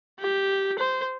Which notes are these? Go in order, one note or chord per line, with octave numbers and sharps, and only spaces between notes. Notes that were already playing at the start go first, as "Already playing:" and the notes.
G4
C5